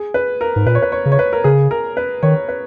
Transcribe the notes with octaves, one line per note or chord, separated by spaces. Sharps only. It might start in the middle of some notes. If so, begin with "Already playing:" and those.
Already playing: G#4
B4
A#4
G#2
A#2 B4
C#5
B4
C#5
C#3
C#5
B4
A#4
C#3 G#4
A#4
B4
D#3 C#5
B4